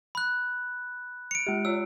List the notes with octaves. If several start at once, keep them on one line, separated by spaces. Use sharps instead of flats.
B5 F#6
C#7 D7 F7
G#3 G4
F4 C#5 E6